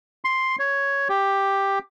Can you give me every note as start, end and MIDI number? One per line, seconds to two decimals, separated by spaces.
0.25 0.56 84
0.59 1.08 73
1.09 1.79 67